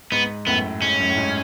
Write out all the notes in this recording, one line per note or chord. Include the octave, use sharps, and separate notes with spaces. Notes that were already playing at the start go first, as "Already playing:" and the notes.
G#2 B3
F#2 A2 B3
G#2 C#4
F#2
A2
G#2